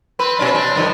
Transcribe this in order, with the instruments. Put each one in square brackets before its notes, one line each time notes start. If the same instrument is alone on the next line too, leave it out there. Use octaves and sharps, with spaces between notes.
[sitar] C4 B4
B2 C#4 D4
C4 D4
G2 D3 F3